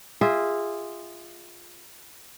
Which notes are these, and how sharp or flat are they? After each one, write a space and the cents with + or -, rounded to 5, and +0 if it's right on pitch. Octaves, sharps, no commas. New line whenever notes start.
F4 -10 G#4 -20 E5 -25